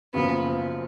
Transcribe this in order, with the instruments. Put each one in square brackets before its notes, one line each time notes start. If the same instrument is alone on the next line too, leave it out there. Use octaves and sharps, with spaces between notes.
[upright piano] F#1 F#2 C#3 F3 [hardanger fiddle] B3